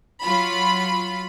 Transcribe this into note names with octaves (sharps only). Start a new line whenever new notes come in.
F#3 F4 B5